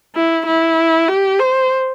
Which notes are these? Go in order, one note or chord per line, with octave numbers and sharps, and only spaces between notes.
E4
E4
G4
C5